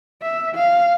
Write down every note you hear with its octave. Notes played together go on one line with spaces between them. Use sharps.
E5
F5